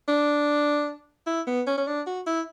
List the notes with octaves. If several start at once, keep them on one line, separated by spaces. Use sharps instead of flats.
D4
E4
B3
C#4
C#4
D4
F#4
E4